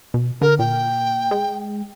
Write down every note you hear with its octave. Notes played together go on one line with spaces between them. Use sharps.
B2
D3 A#4
A#2 G5
G#3